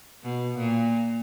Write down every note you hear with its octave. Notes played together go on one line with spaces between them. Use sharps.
B2
A#2